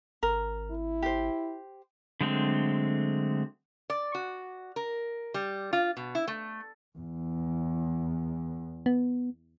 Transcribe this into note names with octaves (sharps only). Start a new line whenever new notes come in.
G#1 A#4
E4
G4 C5
D3 F#3 G#3 A3 C4
D5
F#4
A#4
G3
F4
B2
E4
A3
E2
B3